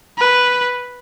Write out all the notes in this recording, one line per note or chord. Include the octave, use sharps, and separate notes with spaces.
B4